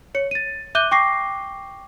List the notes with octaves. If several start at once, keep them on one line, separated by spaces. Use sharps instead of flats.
C#5 C#7
A6 D#7
E5 D6 F#6 G6 D#7 G7
G5 C#6 D6 A#6 C7